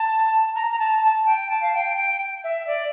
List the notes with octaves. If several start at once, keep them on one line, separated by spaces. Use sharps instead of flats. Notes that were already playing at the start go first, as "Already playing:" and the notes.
Already playing: A5
A#5
A#5
A5
A5
G5
A5
F5
G5
G5
E5
D5